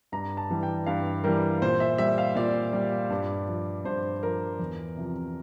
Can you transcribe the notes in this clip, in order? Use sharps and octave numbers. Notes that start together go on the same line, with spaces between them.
G2 A#5
A5
E3 G3
G5
G2 F5
E3 G3 A#4
A#2 C5
E5
G3 E5
F5
A#2 D5
G3
G2
F3
G2 C5
F3 A#4
E2
C3 F3